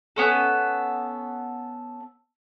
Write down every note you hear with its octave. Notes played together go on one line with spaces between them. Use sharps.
B3 C#4 A4